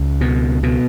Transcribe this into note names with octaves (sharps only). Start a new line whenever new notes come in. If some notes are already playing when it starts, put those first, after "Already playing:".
Already playing: C#2
B2
B2